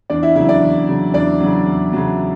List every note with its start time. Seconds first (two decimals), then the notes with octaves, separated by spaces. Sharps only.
0.10 E2 D4 D5
0.23 E4 E5
0.36 C#3 F#3 E4 E5
0.49 D4 D5
0.62 E2
0.88 C#3 F#3
1.14 E2 D4 D5
1.40 C#3 F#3
1.67 E2
1.93 C#3 F#3